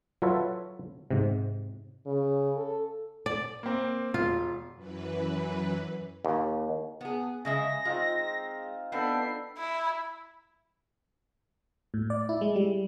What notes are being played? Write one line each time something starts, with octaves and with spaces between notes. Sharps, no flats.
F#3 F4 A4 B4 C#5 E5
G#2 C3
C#3
A4
D5
A#3 C4
E1 F4
F#2 E3 B4
D#2
B3 G#4
C#3 G#3 E5 A#6
G#3 C4 D#4 F4
B3 C4 D4 A4 B4 G5 C7
E4
A2
D5
E4
G#3
G3